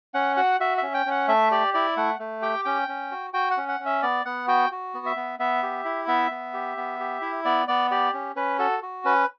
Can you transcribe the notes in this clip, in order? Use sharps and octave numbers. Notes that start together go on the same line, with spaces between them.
C#4 F#5
F#4 F#5
F#4 E5
C#4 E5
G5
C#4 F#5
A3 E5
G4 D5
E4 D5
A3 F#5
A3
G4 G5
C#4 G5
C#4
F#4
F#4 G5
F#5
C#4
F#5
C#4
E5
B3 D5
B3 F#5
F#4 G5
F#4
B3
E5
B3
B3 E5
G4
E4
B3 E5
B3
G4
B3
G4
E4
B3 D5
B3 D5
G4 D5
C#4
C#4 B4
F#4 A4
F#4
C#4 B4